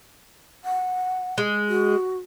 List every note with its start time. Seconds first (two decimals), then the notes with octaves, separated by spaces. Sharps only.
0.64 F#5
1.38 G#3
1.69 F#4